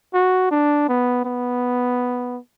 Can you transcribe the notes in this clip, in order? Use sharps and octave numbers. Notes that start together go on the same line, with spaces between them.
F#4
D4
B3
B3